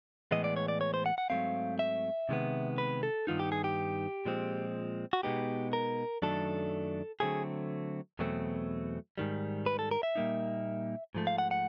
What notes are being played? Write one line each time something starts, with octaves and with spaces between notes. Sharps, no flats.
A2 E3 G#3 B3 D#5
D5
C#5
D5
C#5
C5
F#5
F#5
G#2 D#3 F#3 A3 C4 F5
E5
C3 D#3 G#3 B3
B4
A4
G2 D#3 G#3 B3 D#4 F4
G4
G#4
G4
A#2 F3 G#3 C4
F#4
B2 G#3 B3 D#4 G4
A#4
F#2 D#3 F#3 A3 D4 A4
D3 F#3 A3 C4 G#4
E2 B2 F#3 A3 C4
G#2 D#3 G3
B4
A4
A#4
E5
A#2 G3 A#3 D#4
G#2 F3 A3
F5
F#5
F#5